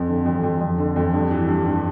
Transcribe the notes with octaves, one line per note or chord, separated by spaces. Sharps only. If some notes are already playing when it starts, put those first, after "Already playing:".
Already playing: F2 C4
D3
F2
F2
F2
D3
F2
G2
E3
G2
G2